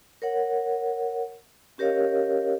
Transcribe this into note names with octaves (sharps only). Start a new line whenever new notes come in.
A#4 C#5 F#5
C#4 G4 A#4 C#5 D#5 F5